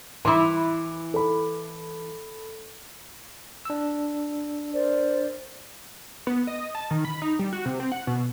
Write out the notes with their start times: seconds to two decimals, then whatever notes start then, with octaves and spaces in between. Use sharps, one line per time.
0.25 E3 E4 C6 D6
1.14 A4 B5
3.65 D4 E6
4.73 A#4 C5 D5
6.27 B3
6.47 D#5
6.75 A5
6.91 D#3
7.05 B5
7.22 D#4
7.39 G3
7.53 F#4
7.65 C3
7.80 C4
7.92 F#5
8.07 B2